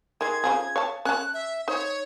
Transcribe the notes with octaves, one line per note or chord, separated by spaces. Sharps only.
D#3 G#3 G#6
C#3 F3 G#4
C#5 F5 A5
C#4 C#5 A5 F#6
E5
D#4 C5 C#5